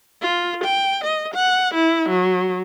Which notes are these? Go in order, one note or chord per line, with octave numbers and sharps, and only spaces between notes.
F4
G5
D#5
F#5
E4
F#3